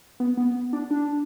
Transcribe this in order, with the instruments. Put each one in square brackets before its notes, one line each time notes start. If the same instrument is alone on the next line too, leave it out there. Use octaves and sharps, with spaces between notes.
[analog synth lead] B3
B3
D4
D4